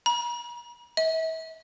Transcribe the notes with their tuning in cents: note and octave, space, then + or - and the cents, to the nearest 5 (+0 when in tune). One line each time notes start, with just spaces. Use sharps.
A#5 +45
E5 -35